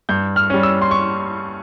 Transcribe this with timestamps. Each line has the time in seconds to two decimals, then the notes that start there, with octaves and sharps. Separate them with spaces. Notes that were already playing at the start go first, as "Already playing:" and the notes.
0.09 G2 G6
0.36 F6
0.50 G3 C#4
0.63 E6
0.82 C6
0.91 C#6